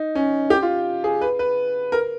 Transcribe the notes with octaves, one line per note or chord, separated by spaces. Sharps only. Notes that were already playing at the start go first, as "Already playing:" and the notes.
Already playing: D#4
C#4
G4
F4
G#4
B4
B4
A#4